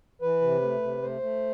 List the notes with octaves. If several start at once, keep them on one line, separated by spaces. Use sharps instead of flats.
E3 B4
C3
A3
C3
A3 C5
A3